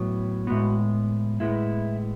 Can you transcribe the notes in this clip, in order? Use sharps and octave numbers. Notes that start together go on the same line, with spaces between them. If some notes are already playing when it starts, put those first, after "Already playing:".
Already playing: A2 F#3 B3
A2 G#3 B3 F#4
A2 G#3 B3 E4